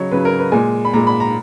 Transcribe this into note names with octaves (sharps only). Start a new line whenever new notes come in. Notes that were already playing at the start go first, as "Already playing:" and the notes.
Already playing: C#3 F#3 C#5 D#5
C#3 F#3 B4
A#4
B4
A#2 G#3 G#5
B5
A#2 G#3 A#5
B5
A#5